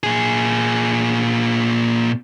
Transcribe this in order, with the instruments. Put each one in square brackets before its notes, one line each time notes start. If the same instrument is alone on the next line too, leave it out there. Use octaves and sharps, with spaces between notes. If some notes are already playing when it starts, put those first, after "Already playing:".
[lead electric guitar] A#2 G#4